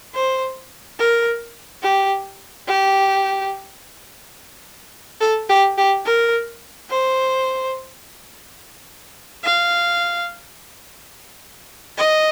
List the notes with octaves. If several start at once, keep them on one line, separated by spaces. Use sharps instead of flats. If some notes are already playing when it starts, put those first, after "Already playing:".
C5
A#4
G4
G4
A4
G4
G4
A#4
C5
F5
D#5